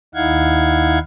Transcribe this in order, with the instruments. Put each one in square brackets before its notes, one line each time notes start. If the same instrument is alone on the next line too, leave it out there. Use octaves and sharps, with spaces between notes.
[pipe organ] D#2 D#4 E4 F5 F#5 G#6